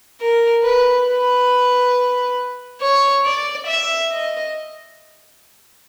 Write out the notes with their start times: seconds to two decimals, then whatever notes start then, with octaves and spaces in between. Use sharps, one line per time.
0.21 A#4
0.64 B4
1.08 B4
2.81 C#5
3.25 D5
3.67 E5
4.11 D#5